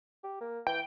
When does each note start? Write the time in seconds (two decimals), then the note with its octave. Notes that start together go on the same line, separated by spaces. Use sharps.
0.24 G4
0.41 A#3
0.67 E3 G5